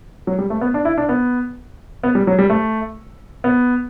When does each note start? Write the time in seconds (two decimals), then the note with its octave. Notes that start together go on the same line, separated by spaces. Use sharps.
0.27 F#3
0.39 G3
0.50 A3
0.61 B3
0.74 D4
0.85 E4
0.98 D4
1.09 B3
2.03 B3
2.15 G3
2.27 F#3
2.39 G3
2.50 A3
3.44 B3